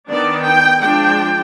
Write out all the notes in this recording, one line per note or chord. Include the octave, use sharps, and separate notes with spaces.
D#3 B3 D4 D5
G5
F3 G#3 D4 G5